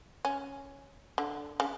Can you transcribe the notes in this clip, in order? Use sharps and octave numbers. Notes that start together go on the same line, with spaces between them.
C#4
D3
C#3